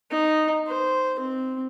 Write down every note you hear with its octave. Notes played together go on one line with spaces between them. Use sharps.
D#4
C5
C4